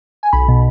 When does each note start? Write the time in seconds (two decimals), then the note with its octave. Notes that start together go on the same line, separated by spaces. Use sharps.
0.23 G#5
0.33 B1 B5
0.48 B2